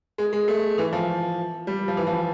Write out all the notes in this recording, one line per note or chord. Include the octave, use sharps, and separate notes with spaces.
G#3
G#3
A3
E3
F3
G3
F3
E3
F3